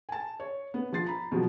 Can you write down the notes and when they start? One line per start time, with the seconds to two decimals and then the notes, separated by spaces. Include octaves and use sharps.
0.09 G#5 A5
0.40 C#5
0.74 B3
0.93 F3 C6 A6 C7
1.06 A#5 B5
1.32 B2 F3 F#3